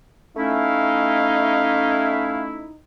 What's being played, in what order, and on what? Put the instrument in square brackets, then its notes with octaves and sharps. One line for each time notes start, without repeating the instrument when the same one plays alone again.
[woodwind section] A3 C#4 E4 [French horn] D#4 [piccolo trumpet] F5